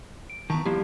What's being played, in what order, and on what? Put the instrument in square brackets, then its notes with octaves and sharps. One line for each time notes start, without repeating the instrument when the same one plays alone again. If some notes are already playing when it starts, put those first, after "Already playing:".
[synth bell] D7
[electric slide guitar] D#3 E3 B3 [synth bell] A5 A#5 C#6
[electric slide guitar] F3 E4 F4 [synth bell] G3 A#3 G4